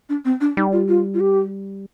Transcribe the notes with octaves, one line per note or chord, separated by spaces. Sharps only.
D4
C4
D4
G3 D#4
F4
F4
F4
G4